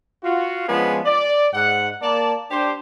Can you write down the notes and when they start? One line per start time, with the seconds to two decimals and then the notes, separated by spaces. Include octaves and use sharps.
0.23 F4 F#4
0.68 F3 G#3 B3 C#4 D4 G#4
1.05 D5
1.53 G#2 F#5
2.02 A#3 D5 A5
2.50 D4 G4 C5